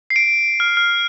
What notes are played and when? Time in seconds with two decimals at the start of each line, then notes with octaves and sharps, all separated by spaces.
0.10 C7
0.16 D7
0.60 F6
0.77 F6